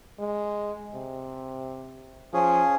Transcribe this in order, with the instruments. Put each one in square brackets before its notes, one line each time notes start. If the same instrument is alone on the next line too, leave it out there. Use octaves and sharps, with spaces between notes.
[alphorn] G#3
C3
[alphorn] F3 [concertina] C#4 G#4